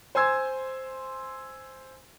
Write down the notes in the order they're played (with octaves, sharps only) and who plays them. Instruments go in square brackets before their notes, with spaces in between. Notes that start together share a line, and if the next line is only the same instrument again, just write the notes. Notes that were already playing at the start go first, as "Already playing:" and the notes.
[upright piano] C5 G#5 C6 E6 G#6